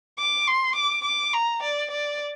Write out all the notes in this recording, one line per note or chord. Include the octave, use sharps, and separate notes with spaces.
D6
C6
D6
D6
A#5
D5
D5